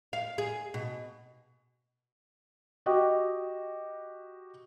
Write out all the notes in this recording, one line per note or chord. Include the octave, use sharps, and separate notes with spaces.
F5
G#4
B2
F#4 G4 D#5